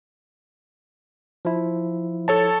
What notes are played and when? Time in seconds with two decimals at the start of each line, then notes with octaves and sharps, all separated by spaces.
1.45 F3 E4
2.28 A4 C#5 A5